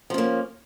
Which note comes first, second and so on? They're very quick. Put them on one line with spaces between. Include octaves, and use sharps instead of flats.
F3 C#4 A#3